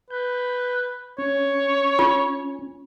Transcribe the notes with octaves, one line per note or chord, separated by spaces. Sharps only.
B4 G6
C#4 C#5
F4